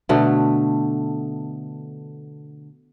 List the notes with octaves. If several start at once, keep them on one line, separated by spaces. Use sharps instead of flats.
B2 D3 A3